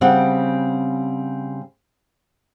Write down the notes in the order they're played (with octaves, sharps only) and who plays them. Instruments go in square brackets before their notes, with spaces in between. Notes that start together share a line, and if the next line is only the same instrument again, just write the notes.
[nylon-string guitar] C#3 G3 C4 G4 F#5